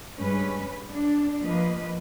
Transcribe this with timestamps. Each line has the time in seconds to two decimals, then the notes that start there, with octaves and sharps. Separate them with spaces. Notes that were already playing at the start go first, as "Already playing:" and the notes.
0.16 G2 G#3 C#4 B4
0.90 D4
1.42 F3 A#3 B4 D#5